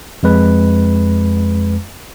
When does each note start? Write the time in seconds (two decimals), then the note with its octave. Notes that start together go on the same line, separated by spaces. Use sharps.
0.23 F2 G#3 B4